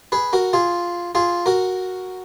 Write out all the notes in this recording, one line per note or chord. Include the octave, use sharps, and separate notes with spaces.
G#4 B4
F#4 A#4
F4 G#4
F4 G#4
F#4 A#4